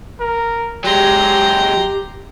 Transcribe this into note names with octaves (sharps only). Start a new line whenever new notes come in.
A#4
F#3 G#3 G4 G5 A#5 C6